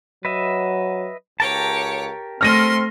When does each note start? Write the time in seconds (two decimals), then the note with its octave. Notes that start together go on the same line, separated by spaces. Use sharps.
0.25 F#3 B4 D#5 E5
1.40 C#2 G4 A#4 C#5 A5 D6
2.41 A3 C4 C6 F6 A#6 D#7